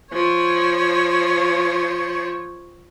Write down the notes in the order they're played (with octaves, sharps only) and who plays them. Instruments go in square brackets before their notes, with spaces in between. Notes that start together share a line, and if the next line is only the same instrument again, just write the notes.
[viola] F3 C#5